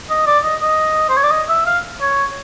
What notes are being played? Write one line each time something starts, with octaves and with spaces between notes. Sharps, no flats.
D#5
D5
D#5
D#5
C5
C#5
D5
D#5
E5
F5
C#5